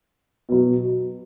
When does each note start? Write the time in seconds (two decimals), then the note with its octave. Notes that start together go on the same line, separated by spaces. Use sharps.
0.49 B2 F#3